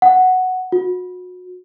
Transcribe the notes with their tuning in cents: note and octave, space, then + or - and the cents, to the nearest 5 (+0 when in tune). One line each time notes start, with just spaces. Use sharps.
F#5 +0
F#4 -30